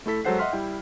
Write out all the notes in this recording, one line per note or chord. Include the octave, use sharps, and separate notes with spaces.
A3 E4 A4 B6
F#3 G#3 A4 C5 F#5 C7
D#5 E5 F#5 C6 F6 B6
G3 E4 G5